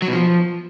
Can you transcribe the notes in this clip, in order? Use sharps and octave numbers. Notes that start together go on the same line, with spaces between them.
F#3
B2
F3